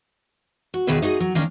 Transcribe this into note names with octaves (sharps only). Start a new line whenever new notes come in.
F#4
D#2 B2 D#3 G#4 B4 E5
D#4 F#4 G#4 D#5
F#3
D#3 A#3 C#4 D4